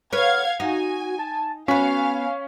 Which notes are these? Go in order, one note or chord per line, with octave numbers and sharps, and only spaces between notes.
B4 C#5 F5 F#5 F6 G#6
D#4 F#4 G#5
A5
B3 C#4 F#4 F5 G#5 C#6 B6